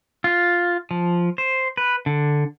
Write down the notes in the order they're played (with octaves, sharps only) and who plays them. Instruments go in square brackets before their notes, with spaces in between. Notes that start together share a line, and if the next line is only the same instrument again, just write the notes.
[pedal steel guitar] F4
F3
C5
B4
D3